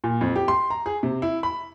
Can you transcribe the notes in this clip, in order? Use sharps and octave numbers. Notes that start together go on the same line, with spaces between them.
A#2
F2
G4
C6
A#5
G#4
C3
E4
B5